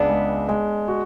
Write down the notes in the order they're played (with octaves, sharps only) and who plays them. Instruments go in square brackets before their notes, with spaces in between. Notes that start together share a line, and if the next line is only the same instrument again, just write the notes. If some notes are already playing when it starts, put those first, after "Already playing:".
Already playing: [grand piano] C#2 [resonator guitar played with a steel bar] B3 D4
[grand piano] G#3
G#3
F#4